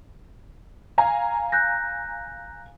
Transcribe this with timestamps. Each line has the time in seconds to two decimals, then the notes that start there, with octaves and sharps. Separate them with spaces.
0.98 F5 G#5 A#5
1.52 F#6 G6 A#6